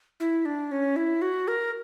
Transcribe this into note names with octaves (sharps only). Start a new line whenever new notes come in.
E4
D4
C#4
E4
F#4
A#4